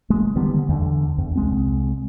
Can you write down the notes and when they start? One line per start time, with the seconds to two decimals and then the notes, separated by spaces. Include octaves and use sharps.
0.10 G#3 A#3
0.36 D3 D#3 G3 B3
0.69 E2 D3
1.18 E2
1.36 C2 G#3 C4